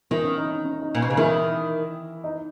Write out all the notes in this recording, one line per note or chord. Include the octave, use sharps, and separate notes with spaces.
D#3 E3 E4
C#4
D#4
C#4
C#4
D#4
A#2
D#4
B2
C#3
D#3 E3 E4
D#4 D#5